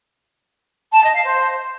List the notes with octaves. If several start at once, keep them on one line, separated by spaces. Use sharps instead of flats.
A5
D#5
F5
C5